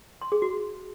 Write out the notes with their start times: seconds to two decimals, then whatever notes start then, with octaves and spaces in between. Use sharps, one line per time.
0.22 C6
0.32 G#4
0.42 F#4